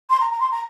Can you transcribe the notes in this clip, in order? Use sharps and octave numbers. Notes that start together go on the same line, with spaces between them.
C6
A#5
A#5
C6
A#5